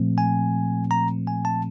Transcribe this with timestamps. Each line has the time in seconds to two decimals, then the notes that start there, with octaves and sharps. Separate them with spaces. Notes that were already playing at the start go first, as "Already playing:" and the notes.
Already playing: A#2 F3 A3 C4
0.18 G#5
0.91 A#5
1.27 G#5
1.45 A5